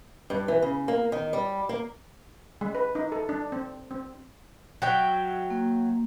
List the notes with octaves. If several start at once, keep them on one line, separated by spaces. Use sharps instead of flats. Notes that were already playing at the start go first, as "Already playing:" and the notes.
G2
E3
C#3
A#3
D#3
G3
A#3
G#3
B4
D#4
A4
D4
C4
C4
F#3 E5 G5
A#3